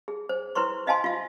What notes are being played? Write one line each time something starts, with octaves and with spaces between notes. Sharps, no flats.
G#4
C5
E4 B4 C5 C6 C#6
C5 D#5 F5 G#5 A5 C6
F4 E5 F5